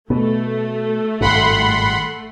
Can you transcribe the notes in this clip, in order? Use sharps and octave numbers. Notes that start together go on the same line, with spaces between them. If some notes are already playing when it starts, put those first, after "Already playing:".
B2 A3 B3
G#1 G2 A#2 F#5 B5 C6